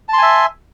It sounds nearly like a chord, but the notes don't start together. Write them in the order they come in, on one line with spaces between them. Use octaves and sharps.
A5 C6 G#5 E5